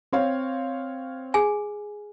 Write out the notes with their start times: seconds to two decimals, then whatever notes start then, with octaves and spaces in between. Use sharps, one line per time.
0.12 C4 C#5 F5
1.34 G#4 G#5